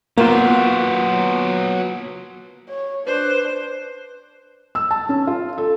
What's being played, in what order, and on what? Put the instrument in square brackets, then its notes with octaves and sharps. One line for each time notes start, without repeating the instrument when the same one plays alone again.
[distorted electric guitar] F#3 C5 [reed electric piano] A#3 F4 [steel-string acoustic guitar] B3
[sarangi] C#5
[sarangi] D4 [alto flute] B4 [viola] C5
[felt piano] E6
A5
C#4
F4
A4